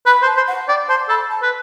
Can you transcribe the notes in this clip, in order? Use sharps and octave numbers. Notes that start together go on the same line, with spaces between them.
B4 B5
C5
A5
C5
F#5
D5 G5
C5 A5
A4 B5
A5
B4